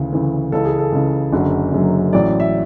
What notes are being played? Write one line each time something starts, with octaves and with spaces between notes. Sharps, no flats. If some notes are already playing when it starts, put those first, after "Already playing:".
Already playing: D2 C#3 E3
D2 C#3 E3
C#2 C#3 E3 A4
G#4
A4
C#2 C#3 E3
F#1 F#2 D3 F#3
F#1 F#2 D3 F#3
A1 A2 F#3 D5
E5